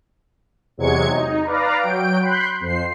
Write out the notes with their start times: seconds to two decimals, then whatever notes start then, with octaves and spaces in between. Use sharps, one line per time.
0.77 E2 C3 F#3 G#3 G#6 C#7
1.10 D#4
1.44 B4 D5 F5 A#5
1.79 F#3 G5 D7
2.22 B5 C6 F#6 G6
2.60 F2 C5 C7